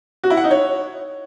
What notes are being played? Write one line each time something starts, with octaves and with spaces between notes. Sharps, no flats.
F#4
E4
F#5
D#4
C#5